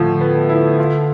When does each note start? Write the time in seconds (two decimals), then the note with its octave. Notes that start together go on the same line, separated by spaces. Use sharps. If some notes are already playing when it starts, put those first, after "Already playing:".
Already playing: A2 D3 F3
0.21 B3
0.49 E4
0.79 F4